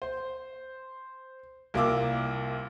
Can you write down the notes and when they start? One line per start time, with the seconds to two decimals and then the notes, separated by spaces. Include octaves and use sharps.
0.02 C5
1.74 C2 A#3 F4 D6 E6